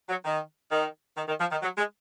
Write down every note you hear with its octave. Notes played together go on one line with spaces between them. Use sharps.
F#3
D#3
D#3
D#3
D#3
F3
D#3
F#3
G#3